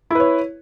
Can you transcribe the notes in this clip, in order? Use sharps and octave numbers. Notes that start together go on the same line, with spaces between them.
E4 B4 C#5